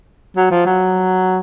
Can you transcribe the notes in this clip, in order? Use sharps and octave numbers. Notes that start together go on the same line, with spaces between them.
F#3
F3
F#3